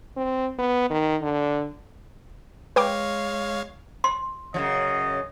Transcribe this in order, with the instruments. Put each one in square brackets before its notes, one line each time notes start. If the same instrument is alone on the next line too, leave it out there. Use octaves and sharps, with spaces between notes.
[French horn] C4
B3
D#3
D3
[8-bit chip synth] G#3 C#5 F5 [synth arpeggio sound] B4 G5 D6
[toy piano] C6
[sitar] F#2 C#3 F3 [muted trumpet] D#5